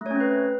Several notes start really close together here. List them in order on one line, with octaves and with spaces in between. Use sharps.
A3 C#5 C#4 C4 B4